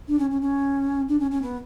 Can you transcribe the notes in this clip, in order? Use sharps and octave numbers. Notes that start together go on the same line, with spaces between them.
D4
C#4
C#4
C#4
D4
C#4
C#4
B3